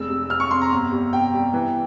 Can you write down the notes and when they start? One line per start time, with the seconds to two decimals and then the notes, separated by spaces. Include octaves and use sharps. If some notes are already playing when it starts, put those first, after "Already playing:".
Already playing: F1 G#3 E6
0.09 C3
0.30 F2 F6
0.40 C#6
0.51 C3 C6
0.62 A#5
0.72 G1
0.91 G3
1.12 C3 G5
1.33 G3
1.54 E3